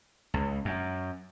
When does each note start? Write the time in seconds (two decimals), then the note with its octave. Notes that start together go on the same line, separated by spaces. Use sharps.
0.34 C#2
0.65 F#2